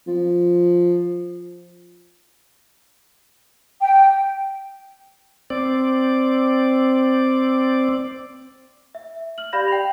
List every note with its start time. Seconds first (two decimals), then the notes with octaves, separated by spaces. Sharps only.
0.07 F3
3.81 G5
5.50 C4 D5
8.95 E5
9.38 F6 F#7
9.53 G4 D5 F5 B5 G6 A#6
9.68 G5 F7